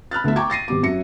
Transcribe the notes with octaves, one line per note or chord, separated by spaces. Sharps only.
B5 F6 F#6 A6
D2 A3 B3 E5
G5 A#5 C#6 D6 G#6
A6 A#6 C7 D#7
G#1 G3 B3 D6
F#2 F#3 E5 A#6 C#7